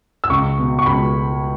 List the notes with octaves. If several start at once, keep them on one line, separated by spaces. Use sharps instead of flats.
E6
C#2 C#6
B2
C#6
C#2 B5